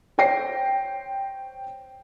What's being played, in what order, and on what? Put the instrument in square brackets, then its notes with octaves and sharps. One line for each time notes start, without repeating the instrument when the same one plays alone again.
[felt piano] C5 C#5 G5 A#6 C7